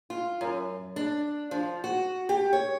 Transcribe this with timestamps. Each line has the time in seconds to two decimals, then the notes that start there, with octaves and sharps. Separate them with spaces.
0.10 F4
0.41 F#2
0.96 D4
1.51 F3
1.84 F#4
2.29 G4
2.53 C#5